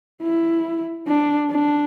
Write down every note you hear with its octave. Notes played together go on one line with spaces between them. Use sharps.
E4
D4
D4